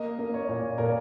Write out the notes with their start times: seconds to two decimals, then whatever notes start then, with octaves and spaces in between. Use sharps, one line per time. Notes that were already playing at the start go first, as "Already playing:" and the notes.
Already playing: A#3 D#5
0.19 A#3
0.34 C#5
0.49 A#2
0.78 A#2 A#4